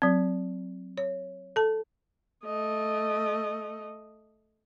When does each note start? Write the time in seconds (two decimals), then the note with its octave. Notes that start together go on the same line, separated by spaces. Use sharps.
0.02 F#3 C4
0.98 C#5
1.56 A4 A5
2.45 A3 D#5